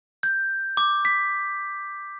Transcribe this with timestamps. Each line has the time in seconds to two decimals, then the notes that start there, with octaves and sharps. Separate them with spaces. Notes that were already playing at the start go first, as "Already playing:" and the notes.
0.23 G6
0.77 D6
1.05 B6